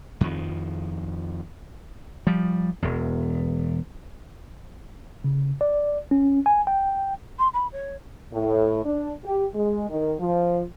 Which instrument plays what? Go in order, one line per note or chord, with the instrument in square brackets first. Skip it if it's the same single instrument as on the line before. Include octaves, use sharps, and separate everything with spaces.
[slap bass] F2 D#3 F3
F3 G3
E1 E2
[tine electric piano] C#3
D5
C#4
G#5
G5
[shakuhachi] C6
B5
C#5
[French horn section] A2
D4
G4
G#3
D#3
F3